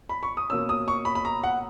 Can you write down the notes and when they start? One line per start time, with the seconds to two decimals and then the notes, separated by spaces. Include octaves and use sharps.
0.09 B5
0.23 C#6
0.37 D#6
0.50 B2 A#3 C#4 E6
0.69 D#6
0.88 C#6
1.05 B5
1.15 B5
1.25 A#5
1.43 F#5